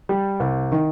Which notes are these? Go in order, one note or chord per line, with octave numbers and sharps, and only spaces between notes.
G3
C2
D#3